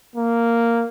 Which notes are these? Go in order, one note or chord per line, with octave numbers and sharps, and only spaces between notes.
A#3